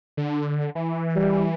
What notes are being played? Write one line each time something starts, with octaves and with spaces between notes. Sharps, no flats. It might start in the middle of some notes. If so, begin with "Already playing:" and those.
D3
E3
G3